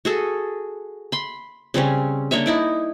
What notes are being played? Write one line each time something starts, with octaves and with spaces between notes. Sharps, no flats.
F#4 G#4 A4
B5 C6
C#3 G3 C4 C#4
A#3 D4 C#5 E5
D#4 E4 D5